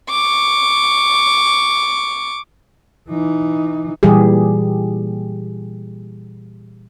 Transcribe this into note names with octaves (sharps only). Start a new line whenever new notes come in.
C#6 D6
E3 D#4
A#2 E3 G3 G4 G#4